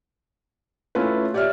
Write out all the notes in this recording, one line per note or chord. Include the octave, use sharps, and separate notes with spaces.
A3 C#4 E4 F4 B4
G4 C#5 D5 E5 F6